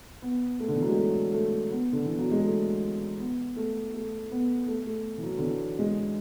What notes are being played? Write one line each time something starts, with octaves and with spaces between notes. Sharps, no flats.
B3
A3
D3
E3
F#3
G#3
A3
A3
B3
D3
E3
F#3
G#3
A3
B3
A3
A3
B3
A3
A3
E3
F#3
D3
E3
G#3